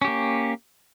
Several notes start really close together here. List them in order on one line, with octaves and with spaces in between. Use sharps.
C#4 G4 A#3